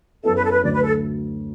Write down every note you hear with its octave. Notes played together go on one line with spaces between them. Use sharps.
F#2 F#3 B3 E4 A4
B4
A4
B4
D2 D3 F#3 D5
B4
A4